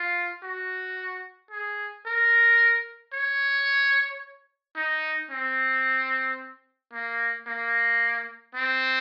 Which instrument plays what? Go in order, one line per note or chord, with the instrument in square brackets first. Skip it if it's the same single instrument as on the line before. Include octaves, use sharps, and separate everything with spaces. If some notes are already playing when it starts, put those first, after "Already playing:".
Already playing: [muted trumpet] F4
F#4
G#4
A#4
C#5
D#4
C4
A#3
A#3
C4